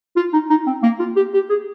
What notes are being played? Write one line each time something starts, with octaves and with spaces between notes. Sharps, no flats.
F4
D#4
D#4
C4
A#3
F4
G4
G4
G#4